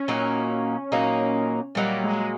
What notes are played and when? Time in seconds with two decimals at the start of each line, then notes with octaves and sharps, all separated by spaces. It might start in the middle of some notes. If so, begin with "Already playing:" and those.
Already playing: C#4
0.08 A#2 F#3 A#3 D#4
0.92 A#2 F#3 A#3 D#4
1.75 A#2 F#3 G3 A#3 D#4
2.04 G#3